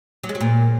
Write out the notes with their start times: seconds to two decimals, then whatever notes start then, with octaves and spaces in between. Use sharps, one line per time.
0.24 F#3
0.29 G#3
0.35 F#3
0.40 A#2